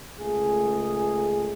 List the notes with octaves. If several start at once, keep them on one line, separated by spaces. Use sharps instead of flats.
C#2 A3 G#4